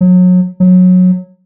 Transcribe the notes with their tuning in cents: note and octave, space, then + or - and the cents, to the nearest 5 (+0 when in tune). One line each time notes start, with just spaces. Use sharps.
F#3 -30
F#3 -20